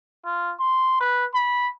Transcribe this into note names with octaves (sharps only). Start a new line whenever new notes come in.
F4
C6
B4
B5